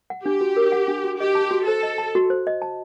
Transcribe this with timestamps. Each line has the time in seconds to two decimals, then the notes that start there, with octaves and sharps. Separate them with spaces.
0.10 F#5
0.26 D4 G4
0.41 F#4
0.56 A#4
0.72 F#5
0.88 D4
1.04 F#4
1.20 G4 D#5
1.35 A5
1.51 F#4
1.67 A4 C5
1.83 D#5
1.98 A5
2.15 F#4
2.30 C5
2.47 D#5
2.62 A5